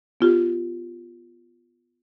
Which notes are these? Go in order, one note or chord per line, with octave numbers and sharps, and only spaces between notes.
B3 F4 G4